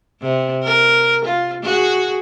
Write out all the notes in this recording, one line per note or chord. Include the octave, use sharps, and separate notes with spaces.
C3
A#4
F4
F#4 G#4